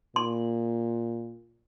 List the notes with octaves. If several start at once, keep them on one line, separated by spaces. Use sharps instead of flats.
A#2 C6